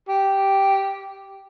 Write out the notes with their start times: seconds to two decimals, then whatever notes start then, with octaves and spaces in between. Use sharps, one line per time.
0.09 G4